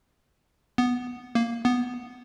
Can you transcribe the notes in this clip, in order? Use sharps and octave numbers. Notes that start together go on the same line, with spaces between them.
B3
A#3
B3